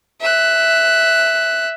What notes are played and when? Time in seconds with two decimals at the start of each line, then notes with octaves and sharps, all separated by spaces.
0.21 E5 F#6